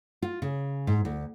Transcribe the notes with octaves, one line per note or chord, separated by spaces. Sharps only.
F4
C#3
G#2
D2